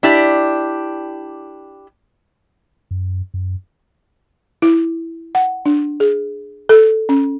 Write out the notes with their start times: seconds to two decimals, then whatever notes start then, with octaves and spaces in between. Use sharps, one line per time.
0.03 D4 E4 G4 D5
2.91 F#2
3.34 F#2
4.62 E4
5.35 F#5
5.66 D4
6.00 G#4
6.69 A4
7.09 C#4